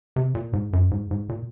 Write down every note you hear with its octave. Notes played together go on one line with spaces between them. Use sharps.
C3
A#2
G#2
F#2
G#2
G#2
A#2